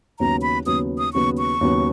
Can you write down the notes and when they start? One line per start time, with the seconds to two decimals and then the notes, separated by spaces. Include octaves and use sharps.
0.20 D#2 C#3 F#3 B3 A#5
0.42 B5
0.66 D#2 C#3 F#3 B3 D#6
0.98 D#6
1.13 D#2 C#3 F#3 B3 C#6
1.38 C#6
1.61 D#2 C#3 F#3 B3